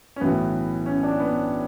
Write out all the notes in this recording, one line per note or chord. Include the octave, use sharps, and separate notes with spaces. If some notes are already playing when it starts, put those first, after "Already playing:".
C#4
B1 A2 E3 B3
C#4
D4
B3